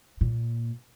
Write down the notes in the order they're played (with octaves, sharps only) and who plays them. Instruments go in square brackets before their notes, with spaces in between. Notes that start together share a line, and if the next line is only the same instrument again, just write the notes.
[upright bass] A#2